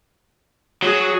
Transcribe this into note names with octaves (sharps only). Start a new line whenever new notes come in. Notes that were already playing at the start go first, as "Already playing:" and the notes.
F#3 F#4 G#4